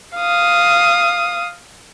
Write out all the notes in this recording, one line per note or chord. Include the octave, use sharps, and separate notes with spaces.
F5 D#6